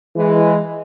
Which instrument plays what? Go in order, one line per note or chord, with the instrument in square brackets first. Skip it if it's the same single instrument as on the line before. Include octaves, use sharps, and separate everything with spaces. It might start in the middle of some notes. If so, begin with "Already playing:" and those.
[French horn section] E3 G#3